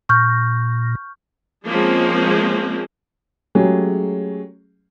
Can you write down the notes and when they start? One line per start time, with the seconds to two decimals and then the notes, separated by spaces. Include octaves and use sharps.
0.09 A#2 C#6 F6 G6
1.68 F3 G#3 A#3 C4 C#4 G#4
3.55 F#3 G#3 A3 C#4 G4 G#4